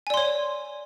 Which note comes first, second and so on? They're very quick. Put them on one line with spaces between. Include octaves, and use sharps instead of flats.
G#5 D5 C6 C#5